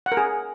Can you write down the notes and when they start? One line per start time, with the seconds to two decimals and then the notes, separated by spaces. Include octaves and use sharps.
0.06 F#5
0.12 A#4
0.17 G#4